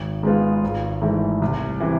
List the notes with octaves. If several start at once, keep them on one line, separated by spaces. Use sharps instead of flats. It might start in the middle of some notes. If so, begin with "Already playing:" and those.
Already playing: G#1
G#2 G#3 B3 F4
G#1
G#2 E3 A3
C2
C3 E3